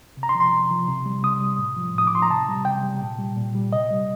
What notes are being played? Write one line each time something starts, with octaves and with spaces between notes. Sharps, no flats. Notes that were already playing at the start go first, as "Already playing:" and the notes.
C3
A#5
C6
F3
C6
C3
F3
C3
G3
C3 D#6
G3
A2
F3
A2 D#6
D6
F3 C6
A#5
C3 A5
G3
C3 G5
G3
A#2
G3
A#2
G3
C3 D#5
G3